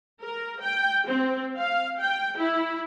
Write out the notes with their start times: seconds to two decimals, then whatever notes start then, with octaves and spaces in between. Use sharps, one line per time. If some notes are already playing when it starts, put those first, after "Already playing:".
0.21 A#4
0.60 G5
1.07 C4
1.57 F5
1.99 G5
2.37 E4